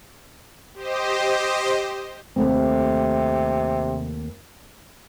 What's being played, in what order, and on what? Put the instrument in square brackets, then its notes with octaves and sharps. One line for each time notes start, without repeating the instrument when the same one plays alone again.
[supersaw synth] G4 C5 D#5
[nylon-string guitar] D#2 A3 C4 [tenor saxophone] C3